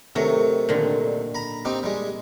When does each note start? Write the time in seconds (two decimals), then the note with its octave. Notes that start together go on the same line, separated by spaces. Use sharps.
0.16 C3 D#3 F#3 A3
0.69 A#2 D3 D#3
1.35 A#5 B5
1.65 C4 D#4 G4
1.83 G3 G#3